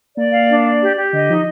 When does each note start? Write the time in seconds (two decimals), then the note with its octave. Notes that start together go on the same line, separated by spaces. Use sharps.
0.16 A#3 D5
0.32 F5
0.49 D4
0.64 D5
0.81 G4
0.97 G4
1.13 D3 D#5
1.28 F3 D#4